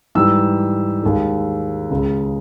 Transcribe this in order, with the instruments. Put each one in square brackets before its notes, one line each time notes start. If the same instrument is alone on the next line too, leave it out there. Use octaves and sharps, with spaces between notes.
[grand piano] G#2 E3 G3 E6
D#2 D#3 G#3
C#2 C#3 G#3